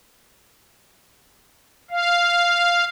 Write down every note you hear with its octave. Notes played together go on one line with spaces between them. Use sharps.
F5